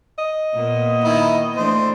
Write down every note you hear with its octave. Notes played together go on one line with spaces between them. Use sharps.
D#5
A#2 A#3 B3
D#3 E4
E3 A3 D4 C5